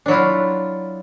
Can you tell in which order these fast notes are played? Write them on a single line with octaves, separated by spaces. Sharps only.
D4 F#3 E4 F4